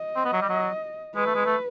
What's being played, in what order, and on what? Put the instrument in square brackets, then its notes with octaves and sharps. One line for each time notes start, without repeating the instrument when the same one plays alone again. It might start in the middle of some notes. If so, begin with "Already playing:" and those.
Already playing: [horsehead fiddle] D#5
[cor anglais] C4
B3
F#3
G3
F#3
[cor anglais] G#3 [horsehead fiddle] B4
[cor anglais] A3
G#3
A3